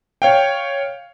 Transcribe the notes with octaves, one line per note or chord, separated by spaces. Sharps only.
C#5 F5 G5